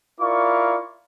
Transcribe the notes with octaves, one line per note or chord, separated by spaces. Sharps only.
E4 F4 A#4 D5 F5 C#6